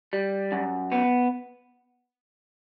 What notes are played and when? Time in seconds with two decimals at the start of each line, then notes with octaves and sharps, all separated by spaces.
0.13 G3
0.52 F#2
0.92 B3